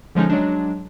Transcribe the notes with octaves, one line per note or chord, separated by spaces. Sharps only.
D3 F3 G#3 C#4 D#4
F#3 G#3 D4